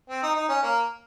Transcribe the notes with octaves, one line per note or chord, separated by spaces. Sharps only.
C4
D#4
D#4
C#4
A#3